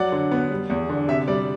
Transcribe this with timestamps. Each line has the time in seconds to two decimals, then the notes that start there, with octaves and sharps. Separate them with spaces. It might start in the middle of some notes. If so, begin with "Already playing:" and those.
Already playing: F#3 D5 F#5
0.12 D3
0.31 B3
0.51 G3
0.70 E2
0.89 D3
1.08 C3 E5
1.28 G3 D5